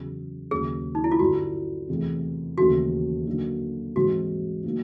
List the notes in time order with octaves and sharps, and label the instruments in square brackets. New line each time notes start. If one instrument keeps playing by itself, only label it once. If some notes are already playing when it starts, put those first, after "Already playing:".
Already playing: [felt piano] E2 C#3 F#3
[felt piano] D#2 C#3 F#3 [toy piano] G#4
[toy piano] D#4
E4
F4
[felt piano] G2 D3 G3 [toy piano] F#4
[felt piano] E2 C3 E3 A3
[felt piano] D#2 C#3 E3 A3 [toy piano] F#4
[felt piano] D3 F#3 A#3 D#4
[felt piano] G#2 E3 G3 C4 D#4 [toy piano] F#4
[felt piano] F#3 A#3 D#4